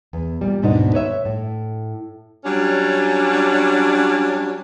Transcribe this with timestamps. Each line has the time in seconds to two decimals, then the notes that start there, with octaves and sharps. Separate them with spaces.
0.13 E2
0.41 A#2 G3
0.62 D#2 G#2 B2 D4 D#4
0.94 B4 C#5 E5
1.25 A2
2.44 F#3 G3 C#4 D4